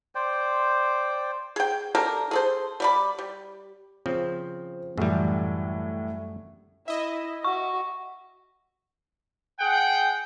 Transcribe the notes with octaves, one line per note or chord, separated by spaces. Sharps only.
C5 D5 G5
G#4 G5
D4 G4 A4 A#4
G#4 A4 C5
G3 D5 B5
G3
C#3 F3 C4 C5
F#2 A2 E3 G3
E4 D#5 E5
F#4 C#6
G#4 F#5 G5